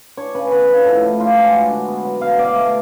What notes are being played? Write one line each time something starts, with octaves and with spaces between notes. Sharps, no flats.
D4 C#5
C#3 B4
B3 B4
F3
A2 A4
A2
D4 F4
G#3
D4 F#4
D3
B3
F#3
B2 F5
B2 D5
F5
A3